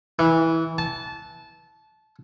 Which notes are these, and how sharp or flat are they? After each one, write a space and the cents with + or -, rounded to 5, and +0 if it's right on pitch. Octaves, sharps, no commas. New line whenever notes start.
E3 -15
A5 -20